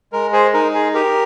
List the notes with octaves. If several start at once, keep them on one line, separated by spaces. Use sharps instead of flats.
G#3 A#4
G#4 C5
D#4 A#4
G#4
G4 A#4